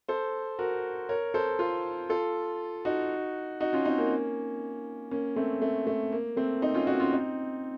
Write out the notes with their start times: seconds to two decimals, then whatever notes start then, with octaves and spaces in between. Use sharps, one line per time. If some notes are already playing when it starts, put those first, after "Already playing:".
0.08 A4 C5
0.59 F#4 A#4
1.09 A#4 C#5
1.34 A4 C5
1.59 F4 A4
2.09 F4 A4
2.85 D#4 F#4
3.60 D#4 F#4
3.73 C#4 F4
3.85 C4 D#4
3.98 A#3 C#4
5.11 A#3 C#4
5.36 A3 C4
5.62 A3
5.87 A3
6.12 A#3
6.36 A3 C4
6.62 C4 D#4
6.74 C#4 F4
6.87 D#4 F#4
7.00 C#4 F4
7.12 C4 D#4